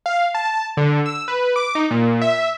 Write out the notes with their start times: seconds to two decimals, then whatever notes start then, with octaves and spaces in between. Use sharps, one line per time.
0.06 F5
0.35 A5
0.77 D3
1.06 E6
1.28 B4
1.56 D6
1.75 D#4
1.91 A#2
2.22 E5